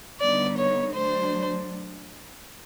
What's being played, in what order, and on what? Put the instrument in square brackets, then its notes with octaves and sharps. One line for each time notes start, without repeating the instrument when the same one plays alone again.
[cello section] D3 G3 B3 D#4 [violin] D5
[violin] C#5
[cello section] F#3 A3 D4 [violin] C5